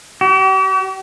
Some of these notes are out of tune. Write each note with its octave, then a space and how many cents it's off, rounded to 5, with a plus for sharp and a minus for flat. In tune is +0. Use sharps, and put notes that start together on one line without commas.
G4 -45